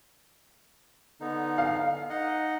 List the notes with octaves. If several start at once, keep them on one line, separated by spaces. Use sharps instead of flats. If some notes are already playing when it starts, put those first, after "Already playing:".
D3 B3 D#4
F5
D#4 D#5 F#5